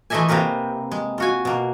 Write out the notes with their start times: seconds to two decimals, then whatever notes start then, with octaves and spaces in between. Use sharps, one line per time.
0.10 E3 A3 A4 D#5 E5 G#5
0.29 C3 A#3 C4 A#4 B4
0.92 G#3
1.18 F4 F#4 G#5
1.45 B2 A#3